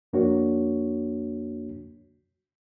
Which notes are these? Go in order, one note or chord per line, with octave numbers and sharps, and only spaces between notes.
F2 A#3 D4 F#4 C#5